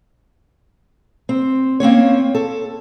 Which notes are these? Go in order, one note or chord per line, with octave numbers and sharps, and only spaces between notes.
C4
A#3 C4 C#4 C#5
A4